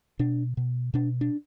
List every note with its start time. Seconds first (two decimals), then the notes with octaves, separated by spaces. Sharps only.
0.19 B2 D4
0.57 B2
0.94 B2 D4
1.21 D4